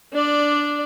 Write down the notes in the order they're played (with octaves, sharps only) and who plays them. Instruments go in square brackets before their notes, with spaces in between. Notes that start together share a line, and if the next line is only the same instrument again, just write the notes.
[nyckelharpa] D4 D5